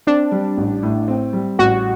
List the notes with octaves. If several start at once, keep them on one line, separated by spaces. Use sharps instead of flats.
C4 D4
G3
A1
A2
C4
G3
A1 F#4